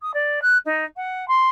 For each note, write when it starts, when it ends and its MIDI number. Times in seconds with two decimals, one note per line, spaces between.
0.02 0.11 87
0.13 0.39 74
0.42 0.57 90
0.65 0.84 63
0.96 1.27 78
1.28 1.49 84